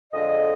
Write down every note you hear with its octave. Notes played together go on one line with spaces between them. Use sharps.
F2 D3 G#3 D#5